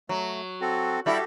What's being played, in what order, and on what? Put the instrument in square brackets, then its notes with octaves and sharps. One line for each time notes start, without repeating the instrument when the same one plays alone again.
[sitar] F#3 [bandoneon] A3
[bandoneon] C4 F#4 A4
[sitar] G3 E4 [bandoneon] F#4 G4 A4